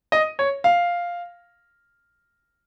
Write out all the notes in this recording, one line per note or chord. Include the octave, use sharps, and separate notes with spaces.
D#5
C#5
F5